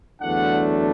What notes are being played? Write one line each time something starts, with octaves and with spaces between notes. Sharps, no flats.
E2 D3 F#3 A3 D4 F#5